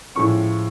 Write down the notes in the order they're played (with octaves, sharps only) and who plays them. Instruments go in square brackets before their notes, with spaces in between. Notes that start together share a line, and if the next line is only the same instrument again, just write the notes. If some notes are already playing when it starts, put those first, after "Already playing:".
[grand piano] A2 F3 G#3 C#4 C#6